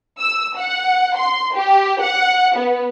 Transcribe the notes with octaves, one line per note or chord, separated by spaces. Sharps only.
E6
F#5
C6
G4
F#5
B3